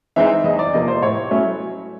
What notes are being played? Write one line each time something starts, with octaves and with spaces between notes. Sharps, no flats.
E3 G#3 C4 D#4 E5
E2 D#5
D5
C3 F3 A#3 D#5
C5
A2 C#5
F#3 A3 C#4 E4